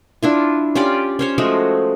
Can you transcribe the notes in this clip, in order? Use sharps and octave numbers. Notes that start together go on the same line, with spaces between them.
D4 E4 F4
C#4 F4 G4 D5
C#4 C5 C#5
F3 G#3 A3 F#4